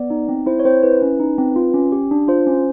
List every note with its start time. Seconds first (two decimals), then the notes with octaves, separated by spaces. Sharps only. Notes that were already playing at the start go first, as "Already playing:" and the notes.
Already playing: B3 D5
0.10 D#4
0.29 C4
0.46 E4 C5
0.59 C#5
0.65 C4 C5
0.83 E4 B4
1.02 C#4
1.20 D#4
1.38 C4
1.56 F4
1.74 C#4
1.92 G4
2.11 D4
2.28 F4 C5
2.47 C#4